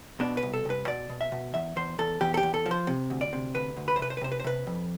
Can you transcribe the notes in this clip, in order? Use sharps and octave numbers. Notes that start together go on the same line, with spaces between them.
B2 D4
B4
C2
A4
C2 B4
B2 D5
B2
E5
B2
E2 E5
E2 C5
E2 A4
E2 G4
A4
G4
E2
A4
F3
C5
C3
D2
D5
C3
D2 B4
D2
B4
C5
C3 B4
C5
B4
C3 C5
B4
C5
C3 B4
F2